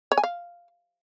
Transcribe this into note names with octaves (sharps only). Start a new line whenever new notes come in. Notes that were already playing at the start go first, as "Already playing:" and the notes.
C#5
G#5
F5